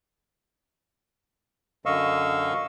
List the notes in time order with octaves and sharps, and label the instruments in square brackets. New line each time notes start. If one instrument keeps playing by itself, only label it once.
[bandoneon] F#2 D3 D#5 F5 C#6 E6